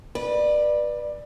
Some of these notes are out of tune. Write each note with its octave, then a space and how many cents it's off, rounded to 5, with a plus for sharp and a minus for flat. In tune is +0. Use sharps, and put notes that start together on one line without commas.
B4 -20 D5 +20